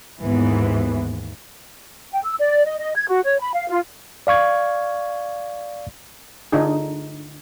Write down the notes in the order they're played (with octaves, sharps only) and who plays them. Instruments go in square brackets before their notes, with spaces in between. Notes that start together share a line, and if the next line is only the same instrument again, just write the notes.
[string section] D#2 G#2 E3 B3
[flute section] G5
E6
D5
D#5
D#5
G#6
F#4
C#5
B5
F5
F4
[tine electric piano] D5 F5 C#6 G#6
[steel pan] D3 D4 D#4 F4 G#4